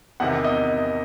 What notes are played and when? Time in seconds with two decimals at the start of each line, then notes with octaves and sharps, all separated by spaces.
0.20 E2 C3 D#3 F#5
0.44 D#5